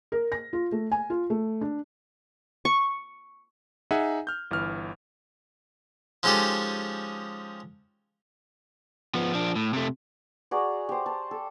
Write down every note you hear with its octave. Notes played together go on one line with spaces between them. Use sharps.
A#4
A#6
F4
A3
G#5
F4
A3
D4
C#6
D#4 G#4 E5 F#5 G#5
F6 G6
G1 E3 F6
F3 G#3 C#4 D#4 G4 A4
F3 B3
F3 D4
A2
C3 A3
F#4 G#4 D5 A#5
G4 C5
A5
A4